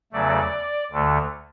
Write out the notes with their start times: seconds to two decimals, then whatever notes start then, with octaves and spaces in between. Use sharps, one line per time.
0.12 E2 C#3 F#3 A3 D5
0.91 D2 D3 A3